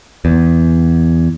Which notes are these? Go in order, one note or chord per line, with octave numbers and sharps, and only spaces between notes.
E2